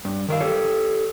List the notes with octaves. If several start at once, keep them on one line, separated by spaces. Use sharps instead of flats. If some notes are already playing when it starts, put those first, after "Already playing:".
G2
D#3 A#4 F5
G4 A4 C#5